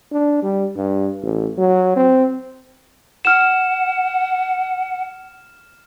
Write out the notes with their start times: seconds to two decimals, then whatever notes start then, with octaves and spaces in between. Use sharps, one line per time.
0.12 D4
0.43 G3
0.76 G2
1.22 A1
1.58 F#3
1.96 C4
3.25 F#5 F6 E7